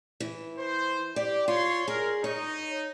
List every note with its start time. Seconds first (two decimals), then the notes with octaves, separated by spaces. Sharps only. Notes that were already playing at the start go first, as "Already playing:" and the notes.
0.20 E3
0.58 C5
1.16 G4 D5
1.48 F4 C#5 C6
1.88 G#4 A#4
2.24 D#4 C#5